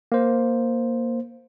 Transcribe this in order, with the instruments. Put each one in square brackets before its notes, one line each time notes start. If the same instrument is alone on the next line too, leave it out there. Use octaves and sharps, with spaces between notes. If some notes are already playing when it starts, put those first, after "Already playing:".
[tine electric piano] A#3 C5